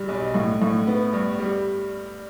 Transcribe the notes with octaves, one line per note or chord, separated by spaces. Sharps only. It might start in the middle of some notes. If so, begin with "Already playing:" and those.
Already playing: G2 G3
B1
A2
A2
B3
G2
G3